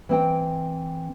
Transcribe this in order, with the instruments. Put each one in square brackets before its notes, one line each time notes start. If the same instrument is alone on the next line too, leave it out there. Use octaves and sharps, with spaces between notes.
[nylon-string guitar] E3 C4 G5